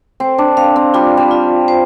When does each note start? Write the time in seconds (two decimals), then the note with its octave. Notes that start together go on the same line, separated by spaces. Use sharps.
0.20 C4 C5
0.38 D4
0.57 C4 F5
0.76 C4
0.94 G3 F4
1.17 G3
1.31 F4
1.68 C5